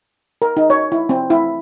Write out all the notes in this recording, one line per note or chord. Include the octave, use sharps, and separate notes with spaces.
A#4
D#4
C#5
E4
C4
E4